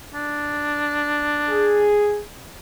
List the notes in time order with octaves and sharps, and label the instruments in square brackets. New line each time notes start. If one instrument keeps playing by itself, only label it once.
[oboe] D4
[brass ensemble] G#4